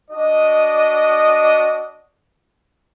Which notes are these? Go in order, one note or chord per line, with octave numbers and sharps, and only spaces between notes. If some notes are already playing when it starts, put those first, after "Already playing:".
D4 F#4 D#5